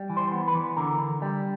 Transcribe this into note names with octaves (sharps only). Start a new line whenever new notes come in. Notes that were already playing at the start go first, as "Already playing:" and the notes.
Already playing: G3
E3
C5
B3
B4
E3
D3 A#4
D3
G3